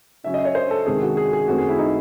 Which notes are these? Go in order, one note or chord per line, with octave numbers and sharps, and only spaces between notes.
C#3 F#3 C#4 E5
D#5
C#5
C5
A4
C3 D#3 G#3 C#4 G#4
F#4
G#4
G#4
F#2 D#3 A3 C4 F#4
G#4
E4
D#4